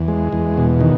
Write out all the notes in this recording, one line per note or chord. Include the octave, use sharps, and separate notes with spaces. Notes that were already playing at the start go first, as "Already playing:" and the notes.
Already playing: E2
G#3
E2
B2
D#3